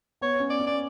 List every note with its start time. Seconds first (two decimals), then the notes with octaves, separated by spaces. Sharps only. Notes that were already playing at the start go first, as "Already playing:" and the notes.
0.21 B3 C#5
0.40 C#4
0.50 D5
0.60 C#4
0.67 D5